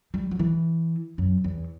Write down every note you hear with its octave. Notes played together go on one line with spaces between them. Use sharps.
G3
F#3
E3
F#2
E2